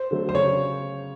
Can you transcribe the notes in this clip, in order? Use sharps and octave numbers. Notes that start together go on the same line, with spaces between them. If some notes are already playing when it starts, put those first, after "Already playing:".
Already playing: C5
D3 F#3 A3
C5
C#3 C#5